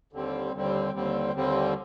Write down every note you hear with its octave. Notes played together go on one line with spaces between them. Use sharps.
D#2 D3 G3 C4
D#2 D3 G3 C4
D#2 D3 G3 C4
D#2 D3 G3 C4